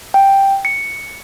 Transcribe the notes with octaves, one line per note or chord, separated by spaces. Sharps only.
G5
C#7